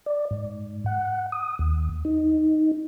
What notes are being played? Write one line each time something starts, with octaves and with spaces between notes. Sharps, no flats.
D5
G#2
F#5
D#6
D#2
D#4